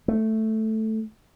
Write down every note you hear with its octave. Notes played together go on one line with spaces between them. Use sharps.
A3